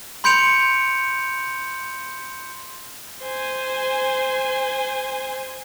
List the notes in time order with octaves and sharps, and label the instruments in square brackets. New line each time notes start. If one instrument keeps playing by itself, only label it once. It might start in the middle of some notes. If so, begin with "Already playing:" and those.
[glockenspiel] B5 C6 G6 C#7 D7 F7
[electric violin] C5 G#5